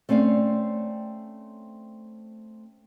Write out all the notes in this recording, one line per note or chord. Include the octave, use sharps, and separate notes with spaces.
A3 C4 C#4 D5 F5